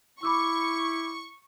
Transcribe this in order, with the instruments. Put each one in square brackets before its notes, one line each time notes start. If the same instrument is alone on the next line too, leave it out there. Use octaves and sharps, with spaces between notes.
[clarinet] E4 [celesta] B5 D6 E6 [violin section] C#6